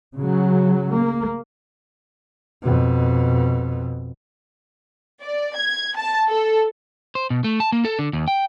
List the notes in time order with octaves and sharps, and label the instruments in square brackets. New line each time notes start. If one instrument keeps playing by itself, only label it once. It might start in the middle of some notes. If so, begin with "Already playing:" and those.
[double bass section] C#3 F#3
A#3
[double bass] F2 B2
[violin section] D5
G#6
A5
A4
[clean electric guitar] C5
B2
A3
A5
A#3
A4
D3
D#2
G5